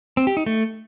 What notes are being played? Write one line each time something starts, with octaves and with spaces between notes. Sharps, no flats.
C4
G4
D#4
A3